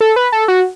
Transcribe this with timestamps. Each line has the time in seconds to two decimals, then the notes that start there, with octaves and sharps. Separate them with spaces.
0.01 A4
0.16 B4
0.32 A4
0.48 F#4